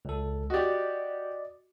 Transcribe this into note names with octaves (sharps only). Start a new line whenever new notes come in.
C#2 A4
F#4 G4 D5 D#5